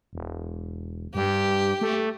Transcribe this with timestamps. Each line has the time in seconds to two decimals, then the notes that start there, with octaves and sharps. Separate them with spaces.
0.13 E1
1.15 G2 G4
1.81 A3